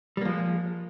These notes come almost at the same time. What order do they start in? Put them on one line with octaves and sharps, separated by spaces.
G3 A#3 F3 G#3